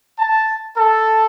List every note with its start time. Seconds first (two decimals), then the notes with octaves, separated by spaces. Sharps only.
0.19 A5
0.77 A4